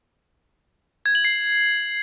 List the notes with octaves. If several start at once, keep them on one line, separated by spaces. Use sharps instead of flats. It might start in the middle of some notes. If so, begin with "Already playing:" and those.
G#6
F#7
C7